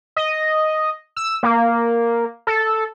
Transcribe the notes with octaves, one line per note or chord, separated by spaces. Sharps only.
D#5
E6
A#3
A4